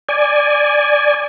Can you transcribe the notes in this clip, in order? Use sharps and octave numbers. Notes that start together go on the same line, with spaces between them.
D5 G#5